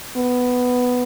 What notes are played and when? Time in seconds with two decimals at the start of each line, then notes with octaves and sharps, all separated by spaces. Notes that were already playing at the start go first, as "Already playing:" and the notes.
0.17 B3